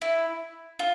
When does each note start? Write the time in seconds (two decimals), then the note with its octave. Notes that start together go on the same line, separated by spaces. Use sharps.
0.02 E4
0.79 F4